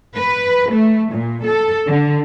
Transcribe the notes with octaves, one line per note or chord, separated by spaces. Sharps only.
B4
A3
A#2
A4
D3